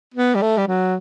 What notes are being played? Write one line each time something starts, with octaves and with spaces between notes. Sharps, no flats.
B3
G3
A3
G3
F#3